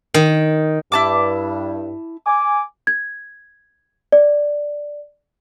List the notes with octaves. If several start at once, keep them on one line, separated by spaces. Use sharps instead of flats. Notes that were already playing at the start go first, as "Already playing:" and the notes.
D#3
G2 E4 A5 D6
G#5 D6
G#6
D5